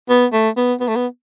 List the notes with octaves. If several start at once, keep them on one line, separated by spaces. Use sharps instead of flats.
B3
A3
B3
B3
A3
B3